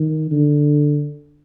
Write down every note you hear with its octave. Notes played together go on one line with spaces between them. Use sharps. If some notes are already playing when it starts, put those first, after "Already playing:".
Already playing: D#3
D3